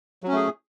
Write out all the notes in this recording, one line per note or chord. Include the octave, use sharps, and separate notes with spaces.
F#3 A3 C#4 G#4